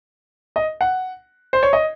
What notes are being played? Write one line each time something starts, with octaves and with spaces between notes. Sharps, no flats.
D#5
F#5
C5
C#5
D#5